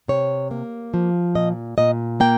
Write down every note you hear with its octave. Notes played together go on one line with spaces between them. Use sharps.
C3 C#5
A#3
F3
A#2 D#5
A#2 D#5
A#3 G5